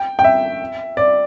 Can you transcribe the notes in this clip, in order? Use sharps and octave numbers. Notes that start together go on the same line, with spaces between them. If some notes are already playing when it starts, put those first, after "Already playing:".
Already playing: G5
G5
E5
D5